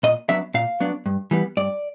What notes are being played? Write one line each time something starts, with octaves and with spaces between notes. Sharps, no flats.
A#2 D#5
F#3 B3 D4 E5
A#2 F5
F#3 B3 D4
G2
E3 G3 B3
G2 D5